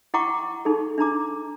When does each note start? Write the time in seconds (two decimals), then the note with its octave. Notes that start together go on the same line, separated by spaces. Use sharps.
0.14 E4 F#5 G5 A#5 C#6 D6
0.65 D#4 G#4 A4
0.98 D4 D#4 A#5 D6